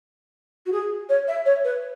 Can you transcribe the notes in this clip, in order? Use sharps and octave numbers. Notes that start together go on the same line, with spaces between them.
F#4
G#4
C#5
E5
C#5
B4